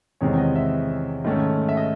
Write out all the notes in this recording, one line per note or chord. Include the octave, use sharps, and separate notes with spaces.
E2 C3 D#3 G#3 C4 C#5
D#5
E5
G#2 D#3 A3 C#4
E5
D#5